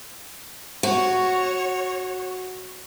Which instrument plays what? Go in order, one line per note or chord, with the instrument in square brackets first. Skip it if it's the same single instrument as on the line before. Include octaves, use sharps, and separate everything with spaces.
[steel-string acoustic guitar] F#4 [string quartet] C#5